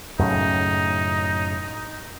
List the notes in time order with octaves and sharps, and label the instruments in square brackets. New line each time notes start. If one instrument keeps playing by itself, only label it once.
[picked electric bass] F#2 A2 C#3 [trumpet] D#4